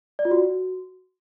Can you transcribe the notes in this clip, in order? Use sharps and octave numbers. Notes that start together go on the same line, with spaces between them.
D5
F4
F#4